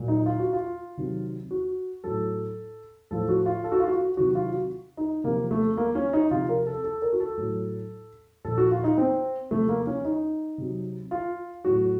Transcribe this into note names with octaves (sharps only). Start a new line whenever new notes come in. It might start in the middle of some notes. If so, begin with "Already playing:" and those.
Already playing: A#2 F#3
D#4
F4
F#4
F4
C3 D#3 F#3
F#4
A2 F#3 A4
A2 F3 A4
F#4
F4
A4
F#4
F4
F#4
C3 D#3 F#3 F#4
F4
F#4
D#4
C3 F3 A#3
A3
A#3
C#4
D#4
C3 F3 F4
A#4
A4
A4
A#4
F#4
A4
A2 F#3
A#2 F3 A4
F#4
F4
D#4
C4
C3 F3 A3
A#3
C#4
D#4
C3 F#3
F4
A2 F#3 F#4